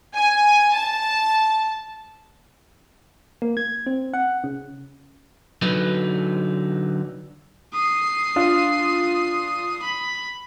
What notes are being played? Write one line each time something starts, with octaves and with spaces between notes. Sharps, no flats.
G#5
A5
A#3
G#6
C4
F#5
C#3
D3 F#3 D#4 B4
D#6 C7
D4 F4 F5
B5